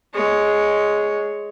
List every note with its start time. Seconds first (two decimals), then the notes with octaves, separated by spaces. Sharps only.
0.14 G#3 C#5